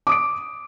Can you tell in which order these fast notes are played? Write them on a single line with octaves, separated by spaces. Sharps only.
D6 D#6 D7